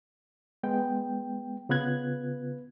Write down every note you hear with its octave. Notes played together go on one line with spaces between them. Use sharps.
G#3 B3 G5
C#3 B3 F4 B4 F#6 G#6